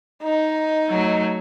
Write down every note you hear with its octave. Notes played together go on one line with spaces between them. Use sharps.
D#4
F#3 A3